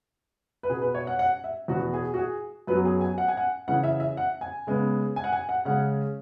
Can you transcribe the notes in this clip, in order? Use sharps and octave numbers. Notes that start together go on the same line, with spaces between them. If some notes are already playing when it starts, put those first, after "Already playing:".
B4
B2 B3 G#4
B4
C#5
F#5
F#5
E5
E2 B2 B3 F#4
G#4
F#4
G#4
F#2 F#3 B3 B4
G#4
G#5
F#5
G#5
F#5
C#3 E3 C#4 F#5
E5
E5
F#5
G#5
C#3 G#3 B3
G#5
F#5
G#5
F#5
C#3 G#3 C#4 F#5